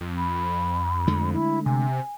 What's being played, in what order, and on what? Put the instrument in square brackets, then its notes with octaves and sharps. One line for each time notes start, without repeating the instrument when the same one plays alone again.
[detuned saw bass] F2
[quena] B5
[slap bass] D3 G#3 A3
[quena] E4
[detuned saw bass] C3 [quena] G#5